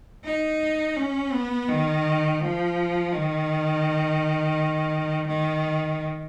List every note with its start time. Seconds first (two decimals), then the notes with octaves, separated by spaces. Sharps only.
0.25 D#4
0.97 C#4
1.32 B3
1.68 D#3
2.40 F3
3.13 D#3
5.28 D#3